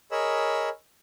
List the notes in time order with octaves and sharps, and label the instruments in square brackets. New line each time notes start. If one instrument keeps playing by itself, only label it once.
[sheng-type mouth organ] G#4 A#4 C#5 D#5 B5 E6